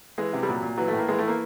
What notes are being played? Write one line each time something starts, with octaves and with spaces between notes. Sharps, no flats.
E3 G#3
C3
G3
A#2 F#3
A#2
E3 F#3
A3
A2 A#3
E3 G#3
A3
E3 A#3